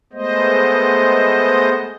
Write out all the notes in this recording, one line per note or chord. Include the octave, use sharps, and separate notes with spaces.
G#3 A3 B3 C5 D#5